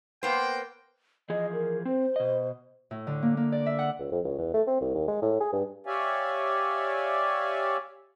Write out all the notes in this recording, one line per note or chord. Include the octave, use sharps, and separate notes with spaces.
A#3 B3 C5 G5
E3 F3 G#4 D#5
A#4
C4 C5
B2 D#5
A2
D3
A#3
A#3
D5
E5
F#5
C#2
F2
C#2
E2
A3
C4
C2
D#2
G#3
A2
G#4
G2
G4 C#5 D5 E5 F5 G#5